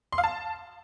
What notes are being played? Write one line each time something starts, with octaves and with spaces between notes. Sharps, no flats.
C6
F5
A5